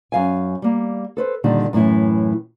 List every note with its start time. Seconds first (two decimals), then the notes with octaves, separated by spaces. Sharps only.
0.12 F#2 F5 G#5
0.62 G3 A#3
1.17 A4 B4 C5
1.44 A#2 D3 D#3 G3
1.73 F#2 A2 E3 E4